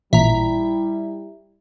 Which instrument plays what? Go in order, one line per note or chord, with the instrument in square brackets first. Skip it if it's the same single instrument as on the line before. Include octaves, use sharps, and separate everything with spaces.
[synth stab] A1 A#2 B6 [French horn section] G3 E4 [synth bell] E5 A#5